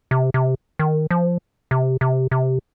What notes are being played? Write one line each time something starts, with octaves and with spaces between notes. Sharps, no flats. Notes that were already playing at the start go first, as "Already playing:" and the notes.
C3
C3
D#3
F3
C3
C3
C3